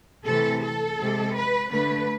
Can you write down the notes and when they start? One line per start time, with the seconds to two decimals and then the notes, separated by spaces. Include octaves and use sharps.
0.26 C3 E3 A3 A4
0.63 A4
0.99 C3 G#3
1.36 B4
1.72 D3 A3 B4